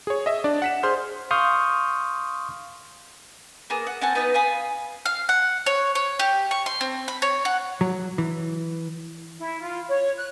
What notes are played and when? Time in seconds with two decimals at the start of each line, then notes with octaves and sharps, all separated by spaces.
0.07 G#4 C#5
0.26 D#5 E5
0.44 D4 D5
0.62 F#5 B6 E7
0.83 G#4 C5 C6 F6 G6
1.31 F5 C6 C#6 D#6 F6 G6
3.70 A#3 B3 G#4 A#4
3.87 F#5
4.01 C4 F#5 G#5 A5
4.15 B3 D#4 B4 D#5
4.34 F5 G#5 B5 D#6
5.05 F5
5.29 F#5
5.66 C#5
5.95 C#5
6.19 G4
6.51 C#6
6.66 C6
6.81 C4
7.08 B5
7.22 C#5
7.45 F#5
7.81 F#3
8.18 E3
9.39 E4
9.60 F4
9.89 C#5
10.17 F#6